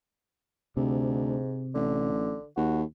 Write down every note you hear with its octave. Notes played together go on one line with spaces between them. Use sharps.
D2 G#2 C3
A1 D3
D#2 F#4